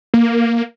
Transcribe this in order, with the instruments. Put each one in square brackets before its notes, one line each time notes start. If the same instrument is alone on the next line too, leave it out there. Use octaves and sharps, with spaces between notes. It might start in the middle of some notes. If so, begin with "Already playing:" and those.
[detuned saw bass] A#3